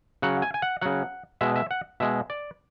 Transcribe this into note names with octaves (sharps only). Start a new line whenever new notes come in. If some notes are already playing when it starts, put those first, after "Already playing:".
C#3 F#3 F#5
G#5
G#5
F#5
C#3 F#3 F#5
B2 G#3 E5
E5
F#5
B2 G#3 E5
D5